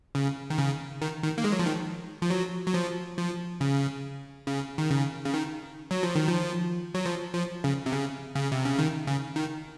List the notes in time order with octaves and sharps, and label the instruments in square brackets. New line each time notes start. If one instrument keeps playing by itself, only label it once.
[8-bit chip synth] C#3
D#3
C#3
D#3
D#3
A#3
G#3
F#3
F3
D#3
F3
F#3
F#3
F3
F3
C#3
C#3
D#3
C#3
C#3
D#3
F#3
F3
D#3
F3
F#3
F3
F3
C#3
C3
C#3
C#3
C3
C#3
D#3
C#3
D#3